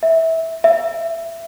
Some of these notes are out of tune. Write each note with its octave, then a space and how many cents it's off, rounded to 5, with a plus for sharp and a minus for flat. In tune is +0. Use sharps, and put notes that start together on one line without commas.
E5 -20
E5 +15